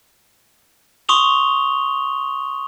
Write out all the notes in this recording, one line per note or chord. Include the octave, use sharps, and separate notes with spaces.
C6 C#6 D#6 F7 G7